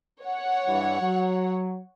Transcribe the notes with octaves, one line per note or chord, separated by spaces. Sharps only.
C#5 F#5
G2 E3
F#3